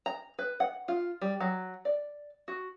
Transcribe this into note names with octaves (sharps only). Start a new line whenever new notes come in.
A#5
B4
F#5
F4
G3
F#3
D5
F#4